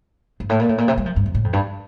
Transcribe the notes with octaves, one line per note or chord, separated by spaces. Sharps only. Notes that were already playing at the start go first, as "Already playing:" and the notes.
G2
A2
A#2
A2
A#2
C3
G3
F3
G2
F2
A2
F2
G2